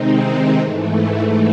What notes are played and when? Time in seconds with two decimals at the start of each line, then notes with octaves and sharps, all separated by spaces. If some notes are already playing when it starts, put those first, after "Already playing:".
Already playing: C3 D#3 G#3 C4 D#4
0.56 G#2 E3 A3